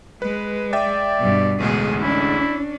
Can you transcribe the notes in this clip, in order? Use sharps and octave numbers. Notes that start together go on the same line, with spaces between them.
G#3 B4
D5 E5 G5 A6
G2 B2
A1 D2 B2 G#3 G#4
C#4 D4 E4